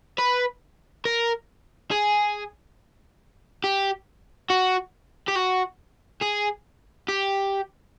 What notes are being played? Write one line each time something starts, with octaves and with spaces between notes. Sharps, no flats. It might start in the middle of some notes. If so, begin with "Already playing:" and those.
B4
A#4
G#4
G4
F#4
G4
F#4
G#4
G4